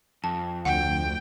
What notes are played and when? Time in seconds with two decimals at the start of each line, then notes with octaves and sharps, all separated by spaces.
0.24 F2 A5
0.65 D2 F#5 G5